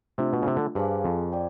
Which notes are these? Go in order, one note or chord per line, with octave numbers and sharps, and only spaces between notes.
C3 A3 D4 F4
B2
C#3
C3
D3
G2 G#4 C5 F5 G#5
F2
D5 G5